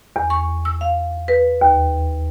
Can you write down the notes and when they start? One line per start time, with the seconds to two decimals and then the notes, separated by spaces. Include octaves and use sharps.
0.16 E2
0.30 C#6
0.65 E6
0.81 F5
1.28 B4
1.61 D#2